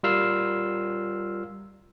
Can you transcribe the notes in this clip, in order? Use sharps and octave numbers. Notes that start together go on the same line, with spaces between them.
G3 F4 A#4 E6 F6 C7